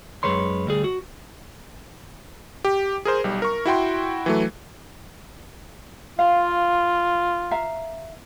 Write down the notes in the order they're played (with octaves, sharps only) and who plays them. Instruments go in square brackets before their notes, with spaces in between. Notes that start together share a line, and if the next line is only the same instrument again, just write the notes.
[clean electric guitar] F#2 G#3 B4 C#5 C6
D2 G3 G#4
F#4
[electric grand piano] G4
G#4 A#4 C5
B1 G3
A#4 C#6
E4 F#4 G5 C6
E3 F#3 A3
[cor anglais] F4 [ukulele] F5
[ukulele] E5 F5 A#5